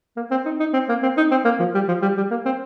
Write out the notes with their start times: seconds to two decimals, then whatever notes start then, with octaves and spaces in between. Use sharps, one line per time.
0.16 A#3
0.31 C4
0.45 D#4
0.60 D#4
0.73 C4
0.89 A#3
1.02 C4
1.17 D#4
1.31 C4
1.45 A#3
1.60 F3
1.75 G3
1.88 F3
2.02 G3
2.17 G3
2.31 A#3
2.45 C4